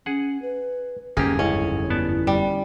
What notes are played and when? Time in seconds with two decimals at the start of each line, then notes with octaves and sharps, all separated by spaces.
0.06 C#4 G#4 F#5
0.42 B4
1.17 G1 F2 G#2 A#3 C#4 G4 G#4
1.39 C#2 C#4 E4
1.90 B3 D5 A5
2.27 G3